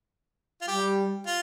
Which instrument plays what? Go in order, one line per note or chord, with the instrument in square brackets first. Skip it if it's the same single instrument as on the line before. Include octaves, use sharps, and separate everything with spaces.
[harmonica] F4
[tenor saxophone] G3 [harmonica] G4
[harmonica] F4